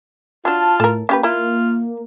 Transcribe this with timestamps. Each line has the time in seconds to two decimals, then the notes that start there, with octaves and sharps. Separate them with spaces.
0.45 F#3 D4 F4 A5
0.80 A2 A4 A#4
1.09 A#3 C#4 G4 B4
1.23 E4 F4 A#4